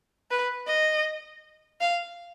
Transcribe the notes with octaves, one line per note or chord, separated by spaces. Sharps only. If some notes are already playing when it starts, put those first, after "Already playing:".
B4
D#5
F5